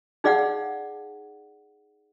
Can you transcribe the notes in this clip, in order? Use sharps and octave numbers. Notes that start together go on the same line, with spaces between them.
D#4 G#4 D5 F5 F#5